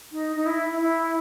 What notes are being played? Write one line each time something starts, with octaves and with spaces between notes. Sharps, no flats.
D#4
D#4
E4
E4